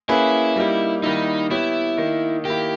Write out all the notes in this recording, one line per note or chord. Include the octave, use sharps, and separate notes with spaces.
A#3 C#4 E4 G#4 B4 E5
G3 A#3 D#4 G4
D#3 G3 A#3 D#4 E4
B3 E4 G4 C#5 E5
D#3 A#3 D#4
D#3 A#3 E4 G4